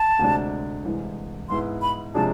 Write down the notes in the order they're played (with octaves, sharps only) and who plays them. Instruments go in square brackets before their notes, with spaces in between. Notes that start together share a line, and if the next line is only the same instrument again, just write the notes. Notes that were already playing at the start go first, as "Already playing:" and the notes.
Already playing: [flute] A5
[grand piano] D2 C3 G#3 D4
C2 C3 E3 G#3
[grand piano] G#2 G#3 B3 E4 [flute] C6
[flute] B5
[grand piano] C3 F3 G#3 D4 G#4 [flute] A5